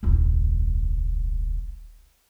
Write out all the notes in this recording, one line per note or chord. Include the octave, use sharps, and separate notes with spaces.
D#1 C2